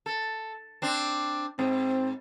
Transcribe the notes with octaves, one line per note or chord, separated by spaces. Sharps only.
A4
C4 D4
G#2 C4